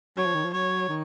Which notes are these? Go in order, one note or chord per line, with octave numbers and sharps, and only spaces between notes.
F#3 C#5
F3
D#3
F3
F#3 C#5
D#3